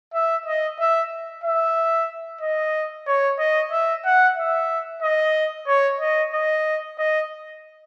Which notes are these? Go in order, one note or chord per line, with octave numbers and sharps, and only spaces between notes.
E5
D#5
E5
E5
D#5
C#5
D#5
E5
F#5
E5
D#5
C#5
D#5
D#5
D#5